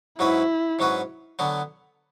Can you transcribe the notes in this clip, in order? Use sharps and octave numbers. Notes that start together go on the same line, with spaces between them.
G#2 F#3 C#4 E4 F#4 B4
G#2 F#3 C#4 F#4 B4
D3 F#3 B3 F#4